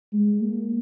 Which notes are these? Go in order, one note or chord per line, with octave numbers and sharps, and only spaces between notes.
G#3
A#3